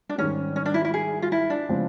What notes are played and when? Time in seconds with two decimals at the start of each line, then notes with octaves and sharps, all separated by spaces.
0.09 D4
0.18 G#2 D#3 G3 C#4
0.56 C#4
0.66 D4
0.74 E4
0.85 E4
0.94 G#4
1.22 F4
1.32 E4
1.50 D4
1.69 C#3 F3 G#3 C4 F4